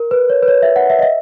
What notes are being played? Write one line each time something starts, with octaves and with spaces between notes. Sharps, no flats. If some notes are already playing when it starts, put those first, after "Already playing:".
Already playing: A#4
B4
C#5
B4
C#5
E5
F#5
E5
D#5
E5